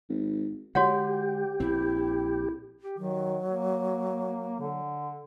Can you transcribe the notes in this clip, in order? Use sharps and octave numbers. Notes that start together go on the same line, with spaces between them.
G#1
D3 G#3 F#4 G4 C#5 F#5
A#1 C4 E4
G4
D#3 F#3
A#3
D3